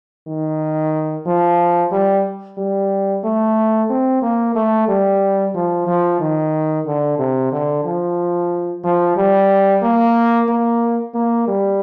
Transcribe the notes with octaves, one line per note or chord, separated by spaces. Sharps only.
D#3
F3
G3
G3
A3
C4
A#3
A3
G3
F3
F3
D#3
D3
C3
D3
F3
F3
G3
A#3
A#3
A#3
G3